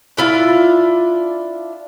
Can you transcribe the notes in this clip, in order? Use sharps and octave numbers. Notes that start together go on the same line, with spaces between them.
D4 E4 F4